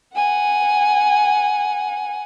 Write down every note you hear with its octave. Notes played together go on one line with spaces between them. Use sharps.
F#5 G#5